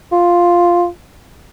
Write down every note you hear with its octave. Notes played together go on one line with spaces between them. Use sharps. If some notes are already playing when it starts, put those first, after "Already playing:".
F4